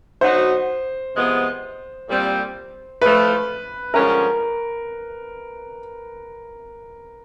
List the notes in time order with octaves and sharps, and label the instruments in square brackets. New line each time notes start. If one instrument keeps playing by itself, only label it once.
[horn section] D3 F#3 B3 D#4 F#4 [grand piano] C5
[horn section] C3 F3 G#3 B3
A#2 G3 C4
[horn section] A2 F3 A3 [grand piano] B4
[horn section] G2 D3 F3 G#3 C#4 [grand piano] A#4